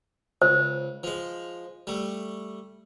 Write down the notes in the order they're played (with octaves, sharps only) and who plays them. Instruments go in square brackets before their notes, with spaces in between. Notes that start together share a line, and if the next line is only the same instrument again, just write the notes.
[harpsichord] C#2 [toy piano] C5
[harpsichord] F3 G#3
G3 A3